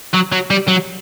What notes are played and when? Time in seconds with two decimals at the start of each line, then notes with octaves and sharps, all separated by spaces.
0.14 F#3
0.32 F#3
0.50 G3
0.68 F#3